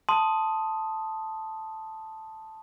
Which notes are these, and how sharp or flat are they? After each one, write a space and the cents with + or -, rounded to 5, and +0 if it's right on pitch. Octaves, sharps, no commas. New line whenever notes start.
A5 +0 C6 +0 D#6 +0